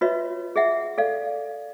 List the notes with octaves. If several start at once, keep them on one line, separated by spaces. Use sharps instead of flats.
F4 F#4 B4 C#5 D#5 E5
G#4 D#5 E5 F#5
A4 D5 F5